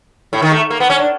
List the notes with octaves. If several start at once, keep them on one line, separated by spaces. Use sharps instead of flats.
A2
D#3
A3
A#3
B3
C#4
D4